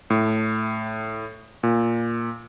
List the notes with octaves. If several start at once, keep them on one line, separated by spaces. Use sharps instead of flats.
A2
A#2